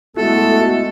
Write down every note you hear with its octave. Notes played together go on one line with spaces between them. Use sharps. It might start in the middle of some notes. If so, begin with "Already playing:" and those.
G#3 A3 B3 E4 F#4 A4